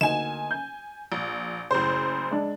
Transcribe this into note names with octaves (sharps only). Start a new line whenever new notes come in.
D2 A#3 D#4 G#5 E7
G6
A#1
F#1 A2 C#3 C5
G#3 D4